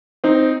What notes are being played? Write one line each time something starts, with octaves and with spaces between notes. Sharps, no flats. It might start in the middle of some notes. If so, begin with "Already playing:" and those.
C4 D#4